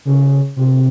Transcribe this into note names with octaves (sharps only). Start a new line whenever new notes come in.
C#3
C3